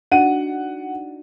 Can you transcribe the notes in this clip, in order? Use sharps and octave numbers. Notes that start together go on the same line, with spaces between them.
D4 D#4 F#4 F#5 D#7